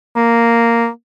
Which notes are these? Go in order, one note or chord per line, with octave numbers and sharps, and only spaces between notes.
A#3